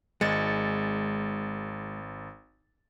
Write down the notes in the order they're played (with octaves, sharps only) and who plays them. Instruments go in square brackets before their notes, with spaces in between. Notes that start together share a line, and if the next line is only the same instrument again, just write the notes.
[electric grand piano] G#1 A6 C#7 [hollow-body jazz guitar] G#3